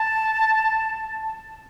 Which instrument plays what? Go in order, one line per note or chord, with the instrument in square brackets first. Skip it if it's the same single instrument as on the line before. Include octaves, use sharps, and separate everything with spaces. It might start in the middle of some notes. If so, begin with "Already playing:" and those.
Already playing: [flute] A5